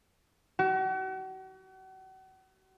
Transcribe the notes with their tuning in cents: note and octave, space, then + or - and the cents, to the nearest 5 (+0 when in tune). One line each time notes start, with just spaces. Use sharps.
F#4 +40